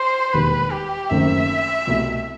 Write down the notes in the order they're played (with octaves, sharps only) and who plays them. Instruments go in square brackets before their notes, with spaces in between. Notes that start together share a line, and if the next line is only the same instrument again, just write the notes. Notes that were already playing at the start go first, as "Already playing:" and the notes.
Already playing: [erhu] C5
[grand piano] E1 D#2 D#3 G3 [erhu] B4
[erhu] G4
[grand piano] F#1 F#2 D#3 A3 C4 [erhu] E5
[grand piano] C2 B2 A3 E4